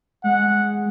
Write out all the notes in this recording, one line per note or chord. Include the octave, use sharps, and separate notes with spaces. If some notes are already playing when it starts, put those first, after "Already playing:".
G#3 F#5